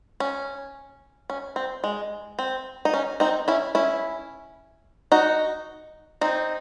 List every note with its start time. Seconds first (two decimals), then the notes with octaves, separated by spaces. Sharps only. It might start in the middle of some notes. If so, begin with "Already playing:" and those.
0.20 C#4
1.30 C#4
1.56 C4
1.84 G#3
2.39 C4
2.85 D#4
2.94 C#4
3.20 C4 D#4
3.48 C#4 E4
3.75 C#4 E4
5.12 D#4 F#4
6.21 C4 D#4